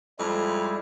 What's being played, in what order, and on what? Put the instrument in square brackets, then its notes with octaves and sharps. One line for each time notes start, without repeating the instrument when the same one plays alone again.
[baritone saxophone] F2 [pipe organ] G3 G#3 E4